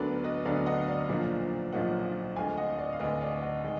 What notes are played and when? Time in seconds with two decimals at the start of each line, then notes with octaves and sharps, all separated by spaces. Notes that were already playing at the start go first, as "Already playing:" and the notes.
Already playing: D2 D3 F#3 B3 D4 A#4 D5
0.24 B4 D#5
0.45 D2 D3 F#3 B3 D4 D5 F5
0.66 D#5 F#5
0.88 D5 F5
1.09 B1 A#2 F3 A#3 D4
1.73 B1 A#2 F3 A#3 D4 D#5 F#5
2.36 D2 D3 G#3 F5 G#5
2.57 D#5 F#5
2.79 D5 F5
2.93 F5
3.00 D2 D3 G#3 B4 D#5
3.21 D5 F5
3.42 D#5 F#5
3.64 D#3 G#3